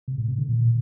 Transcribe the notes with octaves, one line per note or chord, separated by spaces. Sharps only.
C3
A2
C3
D3
A#2